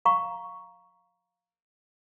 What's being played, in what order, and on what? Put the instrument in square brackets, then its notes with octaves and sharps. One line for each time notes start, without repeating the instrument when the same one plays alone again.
[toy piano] F5 A#5 C#6